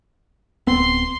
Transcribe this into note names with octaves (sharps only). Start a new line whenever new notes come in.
D1 B3 C4 C6